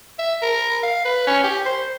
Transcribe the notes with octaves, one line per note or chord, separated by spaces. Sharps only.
E5
A#4
F5
B4
C#4
G4
C5